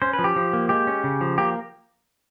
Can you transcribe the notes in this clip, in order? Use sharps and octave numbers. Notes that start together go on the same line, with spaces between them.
C#4 C5
B4
F3
G4
F3
A#3
G#3 G4
C#4
C#3
F3
A#3 G4